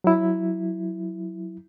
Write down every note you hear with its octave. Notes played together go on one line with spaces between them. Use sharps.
F#3 E4